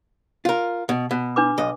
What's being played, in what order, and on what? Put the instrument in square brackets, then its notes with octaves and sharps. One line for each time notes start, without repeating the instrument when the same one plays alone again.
[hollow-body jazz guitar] F4 A#4
B2
B2
[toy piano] D4 B4 D6
[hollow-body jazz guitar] B1 D#5